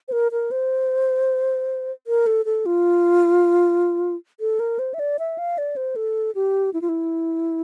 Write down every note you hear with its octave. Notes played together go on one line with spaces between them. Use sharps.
C5
A#4
A#4
C5
A#4
A4
A4
F4
A4
A#4
C5
E5
D5
E5
F5
D5
C5
A4
G4
E4
F4
E4